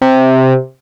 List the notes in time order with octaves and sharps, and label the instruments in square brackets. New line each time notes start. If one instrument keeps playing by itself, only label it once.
[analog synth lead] C3